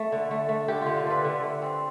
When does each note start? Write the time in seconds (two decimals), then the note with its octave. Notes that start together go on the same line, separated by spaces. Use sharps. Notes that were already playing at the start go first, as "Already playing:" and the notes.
Already playing: A3
0.12 D3
0.31 A3
0.49 A3
0.68 D3 G4
0.81 F4
0.87 D3
0.96 F4
1.06 D3 A4 B4
1.24 D3
1.43 A3
1.62 C4